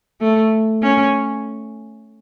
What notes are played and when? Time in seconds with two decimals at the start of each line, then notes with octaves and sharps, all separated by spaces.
0.21 A3
0.82 C#4